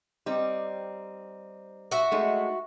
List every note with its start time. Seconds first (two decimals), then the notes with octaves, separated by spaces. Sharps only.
0.26 G3 C4 D#4
1.91 F#4 E5
2.12 G#3 A3 D#4